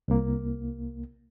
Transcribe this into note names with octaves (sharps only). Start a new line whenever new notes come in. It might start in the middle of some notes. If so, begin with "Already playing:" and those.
C2 A#3